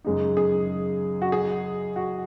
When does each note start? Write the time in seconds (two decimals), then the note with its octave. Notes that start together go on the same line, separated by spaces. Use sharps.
0.04 F#2 C#3 G#3 D#4
0.37 G#4
1.22 F#4
1.32 G#4
1.96 F#4